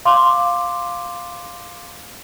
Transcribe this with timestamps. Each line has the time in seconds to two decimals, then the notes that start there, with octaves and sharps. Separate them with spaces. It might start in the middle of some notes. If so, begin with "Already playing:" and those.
0.05 F5 C6 D6